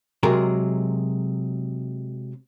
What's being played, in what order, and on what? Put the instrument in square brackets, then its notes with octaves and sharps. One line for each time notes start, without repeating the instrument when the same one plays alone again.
[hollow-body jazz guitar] C3 F#3 G#3 G#4 A#4